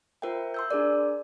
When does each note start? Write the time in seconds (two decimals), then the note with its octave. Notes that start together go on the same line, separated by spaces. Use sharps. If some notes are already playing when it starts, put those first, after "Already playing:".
0.22 F4 A#4 C5 E5 G5
0.54 C6 E6 G6
0.71 D4 G#4 A#4 D5